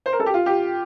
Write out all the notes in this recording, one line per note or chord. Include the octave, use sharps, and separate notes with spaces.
C5
A#4
A4
G4
F4
G4